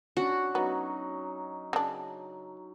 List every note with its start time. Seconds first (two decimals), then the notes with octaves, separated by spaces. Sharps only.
0.17 C#4 D4 F#4
0.55 F#3 B3 D#4
1.73 C#3 D4